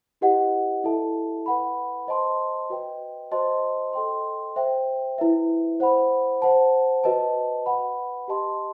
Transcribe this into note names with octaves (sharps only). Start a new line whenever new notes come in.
E4 G4 B4 D#5 F#5
E4 A4 E5 A5
B4 F#5 B5
C5 D#5 A5 C6
F#4 B4 D#5 G5
F#4 C5 D#5 A5 C6
A4 D#5 G5 C6
C5 E5 G5
E4 B4 E5
C5 F#5 B5
C5 F#5 A5
F#4 B4 D#5 A5
B4 F#5 B5
G4 D#5 A5 C6